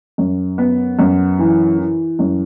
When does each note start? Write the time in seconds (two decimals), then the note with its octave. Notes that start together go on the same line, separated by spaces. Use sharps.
0.18 F#2
0.58 B3
0.99 F#2
1.39 E3
1.79 E3
2.19 F#2